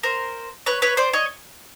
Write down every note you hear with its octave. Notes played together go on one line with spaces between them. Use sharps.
A#4 C5
B4 C#5
B4 C#5
C5 D5
C#5 D#5